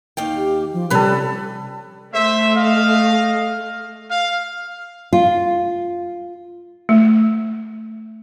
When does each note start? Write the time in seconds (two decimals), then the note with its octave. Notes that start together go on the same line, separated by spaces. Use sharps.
0.17 D#2 F5 G5
0.36 G4
0.73 F3
0.90 C3 G3 C#4 A4 B4
2.13 A3 C5 E5
2.55 D#5 F5
4.10 F5
5.13 F4
6.89 A3